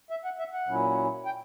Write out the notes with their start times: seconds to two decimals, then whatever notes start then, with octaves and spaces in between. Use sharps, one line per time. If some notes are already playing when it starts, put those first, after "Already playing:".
0.10 E5
0.24 F#5
0.39 E5
0.53 F#5
0.67 A#2 F#3 C#4 E4
1.25 G5